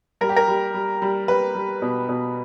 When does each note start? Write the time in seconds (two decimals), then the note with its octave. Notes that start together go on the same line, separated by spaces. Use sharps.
0.21 G3 A#4
0.29 G4
0.36 A#4
0.48 G3
0.74 G3
1.02 G3
1.28 G3 B4
1.55 G3
1.82 B2
2.09 B2